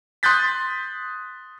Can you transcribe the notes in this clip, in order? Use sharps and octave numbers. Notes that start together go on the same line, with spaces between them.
C6 D#6 F#6 G6 A6 B6